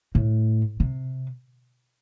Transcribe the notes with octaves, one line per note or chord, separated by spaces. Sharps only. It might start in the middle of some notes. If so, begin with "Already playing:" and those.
A2
C3